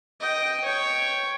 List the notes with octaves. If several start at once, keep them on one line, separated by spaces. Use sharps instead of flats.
D#5 G5
C#5 G5